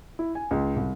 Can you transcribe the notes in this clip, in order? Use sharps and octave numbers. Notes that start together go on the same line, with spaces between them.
E4
G#5
C#2
C2